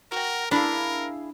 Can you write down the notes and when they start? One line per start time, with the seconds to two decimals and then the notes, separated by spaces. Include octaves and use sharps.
0.12 F#4 A#4 G5
0.51 D4 E4 G#4 A#4 F5